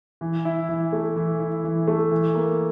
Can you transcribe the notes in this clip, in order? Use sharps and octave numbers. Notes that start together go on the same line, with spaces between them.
E3
E4
E3
A3
E3
E4
E3
A3
E3
A#3